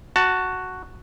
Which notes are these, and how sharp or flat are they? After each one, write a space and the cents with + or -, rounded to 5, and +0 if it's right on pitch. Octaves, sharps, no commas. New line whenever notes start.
F#4 +0 A5 +20